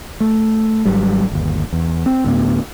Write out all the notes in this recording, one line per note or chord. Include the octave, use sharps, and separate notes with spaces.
A3
G#1 G#2 F#3 G3
G1 D#2
E2
C4
D2 A2 B3